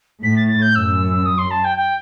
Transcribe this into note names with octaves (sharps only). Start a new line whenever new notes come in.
A2 B6
A6
A6
G6
F#2 E6
D#6
C6
A5
G5
G5